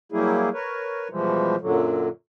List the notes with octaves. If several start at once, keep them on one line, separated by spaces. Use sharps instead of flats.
F#3 G3 A#3 E4 G#4
A#4 B4 C#5
B2 E3 F3 G3 G#3
F#2 A#2 D3 F#3